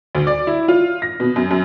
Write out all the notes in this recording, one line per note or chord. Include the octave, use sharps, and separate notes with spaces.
D2
D5
E4
F4
A#6
B2
F#2
F#2